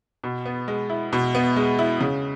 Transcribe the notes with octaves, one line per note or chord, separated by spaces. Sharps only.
B2
B3
G#3
E4
B2
B3
G#3
E4
C#3